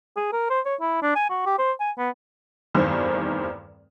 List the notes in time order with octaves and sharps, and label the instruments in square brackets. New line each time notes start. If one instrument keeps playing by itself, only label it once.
[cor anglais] G#4
A#4
C5
C#5
E4
D4
G#5
F#4
G4
C5
G#5
B3
[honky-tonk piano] F1 E2 G2 D#3 C5